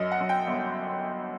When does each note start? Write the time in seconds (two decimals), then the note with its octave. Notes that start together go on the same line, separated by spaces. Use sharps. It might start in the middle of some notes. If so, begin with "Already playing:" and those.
Already playing: F#2 D#5
0.11 F#5
0.20 F#2
0.29 G5
0.47 G1